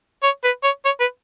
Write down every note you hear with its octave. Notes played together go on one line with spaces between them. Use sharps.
C#5
B4
C#5
C#5
B4